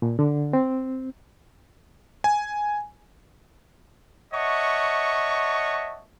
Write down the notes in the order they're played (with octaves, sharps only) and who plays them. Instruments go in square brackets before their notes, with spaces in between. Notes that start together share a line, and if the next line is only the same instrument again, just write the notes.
[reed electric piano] A#2
D3
C4
[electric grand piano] G#5
[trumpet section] C#5 D#5 E5 F#5 A5 C#6